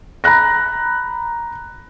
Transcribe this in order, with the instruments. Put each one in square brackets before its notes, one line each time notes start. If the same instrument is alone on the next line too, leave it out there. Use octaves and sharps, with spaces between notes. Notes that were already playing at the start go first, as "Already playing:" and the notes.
[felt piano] A#5 B5 F#6 A#6